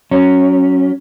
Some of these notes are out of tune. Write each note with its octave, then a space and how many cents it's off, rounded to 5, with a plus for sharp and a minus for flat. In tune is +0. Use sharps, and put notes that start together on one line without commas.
F#3 +0 C#4 +0